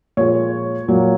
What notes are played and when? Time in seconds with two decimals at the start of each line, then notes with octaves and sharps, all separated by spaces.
0.17 A#2 F3 G#3 C#5
0.88 A#2 F#3 A#3